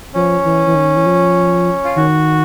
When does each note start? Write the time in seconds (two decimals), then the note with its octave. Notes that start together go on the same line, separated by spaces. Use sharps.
0.14 F3 C#4
0.45 E3
0.67 E3
0.75 D#3
0.96 E3
1.06 F3
1.84 F4
1.96 D#3 F#4